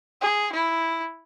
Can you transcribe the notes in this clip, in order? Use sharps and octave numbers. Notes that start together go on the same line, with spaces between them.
G#4
E4